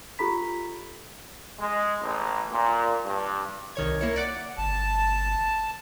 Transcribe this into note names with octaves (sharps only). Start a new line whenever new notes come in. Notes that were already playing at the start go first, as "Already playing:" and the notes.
F4 G4 A4 A#5 B5 B6
G#3
A1
A#2
G2
C2 D#3 C#5 G#6
A#3 E4 C#5
D5 F#5 D6
G1 A5